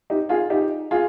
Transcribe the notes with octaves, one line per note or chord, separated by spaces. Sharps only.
D#4 G4
F4 G#4
D#4 G4
F4 G#4